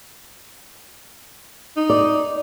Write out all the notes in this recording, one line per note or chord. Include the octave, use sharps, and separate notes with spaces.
D#4
D5